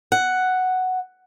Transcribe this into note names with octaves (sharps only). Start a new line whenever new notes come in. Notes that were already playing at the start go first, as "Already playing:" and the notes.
F#5